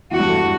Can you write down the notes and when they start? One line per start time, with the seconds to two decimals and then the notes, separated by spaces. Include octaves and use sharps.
0.11 E2 E3 F#4
0.19 G2 G3
0.27 A2 A3